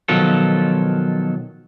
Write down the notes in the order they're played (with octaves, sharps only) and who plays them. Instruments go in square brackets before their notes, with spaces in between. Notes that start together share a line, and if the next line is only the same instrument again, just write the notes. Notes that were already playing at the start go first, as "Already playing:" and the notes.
[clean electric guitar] B2 D#3 F3 F#3 F4 A4